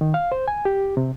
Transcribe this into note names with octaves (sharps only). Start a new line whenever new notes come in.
D#3
F5
C5
G#5
G4
C3